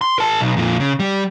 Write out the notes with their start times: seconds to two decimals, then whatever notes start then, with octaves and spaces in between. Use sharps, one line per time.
0.01 C6
0.18 A#4 A5
0.41 B1
0.56 F2 A#2
0.80 C#3
0.99 G3